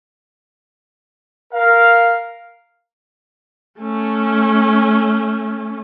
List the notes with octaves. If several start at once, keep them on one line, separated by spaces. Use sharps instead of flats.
A#4 F5
A3 C#4